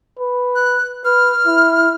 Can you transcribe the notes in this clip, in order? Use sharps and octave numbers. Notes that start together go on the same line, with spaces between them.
B4
F#6
B4 F6
E4